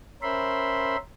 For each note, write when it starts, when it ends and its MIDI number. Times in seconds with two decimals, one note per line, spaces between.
0.22 0.96 61
0.22 0.96 70
0.22 0.96 72
0.22 0.96 76
0.22 0.96 83
0.22 0.96 84